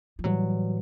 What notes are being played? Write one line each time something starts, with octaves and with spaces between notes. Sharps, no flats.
F3
A2 E3 F#3 G3